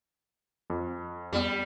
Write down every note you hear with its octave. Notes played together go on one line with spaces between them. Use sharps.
F2
F2 G3 B3